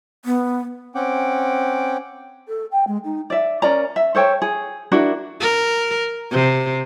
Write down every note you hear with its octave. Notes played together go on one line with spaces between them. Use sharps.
B3
C4 C#4 F#5 G5 D6
A4
G5
G#3
D#4
D5 E5
C#4 A#4 D5 A#5
E5
A4 C5 C#5 G5
G#4
D4 E4 F#4 A#4
A#4
C3